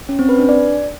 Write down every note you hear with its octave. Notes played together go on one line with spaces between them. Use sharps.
C#4
C4
B4
D4
D5